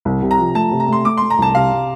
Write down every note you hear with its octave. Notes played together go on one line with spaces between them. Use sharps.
C2
C3
A#5
F3
A3 A5
C3
A#5
A3 C6
A3 D6
A3 C6
A#5
C2 A5
C3 F5
C3